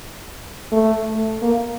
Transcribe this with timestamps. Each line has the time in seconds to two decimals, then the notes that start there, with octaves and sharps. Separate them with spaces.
0.72 A3
1.42 A#3